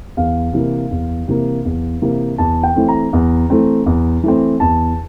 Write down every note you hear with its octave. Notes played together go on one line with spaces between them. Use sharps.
E2 F5
C3 E3 A#3
E2
C3 E3 A#3
E2
C3 E3 A#3
E2 A5
G5
E3 A3 C4
A#5
E2
E3 A3 C4
E2
E3 A3 C4
E2 A5